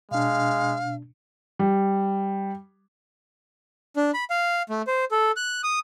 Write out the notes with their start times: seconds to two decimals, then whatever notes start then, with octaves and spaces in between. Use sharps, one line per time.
0.11 B2 G#3 D4 F5
1.59 G3
3.97 D4
4.14 B5
4.30 F5
4.69 A3
4.87 C5
5.11 A4
5.36 F#6
5.63 D#6